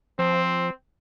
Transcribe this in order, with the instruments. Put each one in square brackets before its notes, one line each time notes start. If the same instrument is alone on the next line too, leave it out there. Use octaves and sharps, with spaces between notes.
[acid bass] F3 [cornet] C4